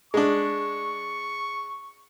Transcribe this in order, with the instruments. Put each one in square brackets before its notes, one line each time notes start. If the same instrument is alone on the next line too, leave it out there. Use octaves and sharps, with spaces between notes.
[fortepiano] G#3 D4 [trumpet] C#6